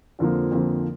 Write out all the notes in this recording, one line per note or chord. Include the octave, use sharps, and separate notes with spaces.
F2 D3 F3 A#3
F2 D3 F3 A#3